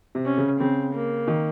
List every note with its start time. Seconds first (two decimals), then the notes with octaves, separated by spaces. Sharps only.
0.15 C3
0.25 C#4
0.37 C#3
0.59 C#3 C4
0.94 A#3
1.28 D#3